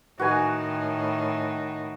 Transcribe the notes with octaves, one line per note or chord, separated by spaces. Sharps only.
A2 D#3 F#4 B4 G#5